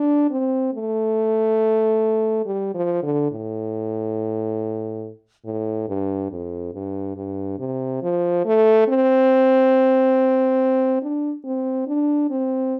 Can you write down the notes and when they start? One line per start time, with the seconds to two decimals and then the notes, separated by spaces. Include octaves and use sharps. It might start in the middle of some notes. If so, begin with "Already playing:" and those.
Already playing: D4
0.31 C4
0.74 A3
2.46 G3
2.74 F3
3.03 D3
3.31 A2
5.45 A2
5.88 G2
6.31 F2
6.74 G2
7.17 G2
7.59 C3
8.02 F3
8.45 A3
8.88 C4
11.02 D4
11.45 C4
11.88 D4
12.30 C4